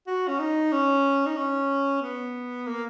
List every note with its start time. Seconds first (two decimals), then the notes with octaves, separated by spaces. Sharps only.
0.07 F#4
0.28 C#4
0.39 D#4
0.72 C#4
1.26 D#4
1.37 C#4
2.02 B3
2.67 A#3